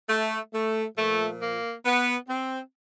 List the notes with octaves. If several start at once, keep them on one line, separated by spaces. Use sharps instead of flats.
A3
A3
A#2 F3 A3
A#3
B3
C4